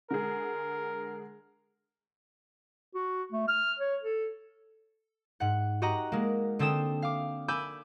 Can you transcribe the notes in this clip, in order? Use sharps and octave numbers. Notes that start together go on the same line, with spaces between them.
D3 G#3 G#4 A#4
F#4
A3
F6
C#5
A4
G#2 F#5
F#4 G4 D#5 F#5 A#5
G#3 A#3
D3 C4 A4 G5 D#6 E7
F5 D6
G#5 B5 D6 E6 G6